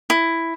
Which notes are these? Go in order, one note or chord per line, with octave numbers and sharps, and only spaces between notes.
E4